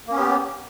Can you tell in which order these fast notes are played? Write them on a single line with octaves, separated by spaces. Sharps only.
A#3 C#4 B3 G4